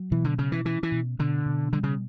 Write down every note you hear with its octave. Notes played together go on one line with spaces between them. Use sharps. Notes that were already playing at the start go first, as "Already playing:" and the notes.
Already playing: F#3
B2 E3
D3
C#3 C#4
E3
E3 C#4
E3
B2
B2 D3
B2
D3 G3
C#3